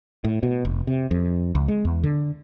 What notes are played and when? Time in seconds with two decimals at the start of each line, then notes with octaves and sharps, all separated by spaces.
0.24 A2
0.43 B2
0.65 F1
0.87 C3
1.11 F2
1.55 C#2
1.68 G#3
1.85 E2
2.03 D3